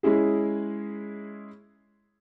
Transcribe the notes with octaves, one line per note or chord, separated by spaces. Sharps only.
G#3 C#4 E4 G#4